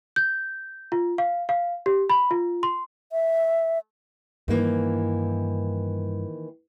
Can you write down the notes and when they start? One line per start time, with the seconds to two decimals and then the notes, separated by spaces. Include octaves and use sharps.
0.16 G6
0.92 F4
1.18 F5
1.49 F5
1.86 G4
2.10 B5
2.31 F4
2.63 C6
3.12 E5
4.48 G2 D#3 E3 A#3